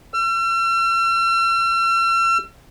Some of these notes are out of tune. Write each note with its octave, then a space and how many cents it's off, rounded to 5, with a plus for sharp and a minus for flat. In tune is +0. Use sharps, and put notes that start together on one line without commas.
E6 +45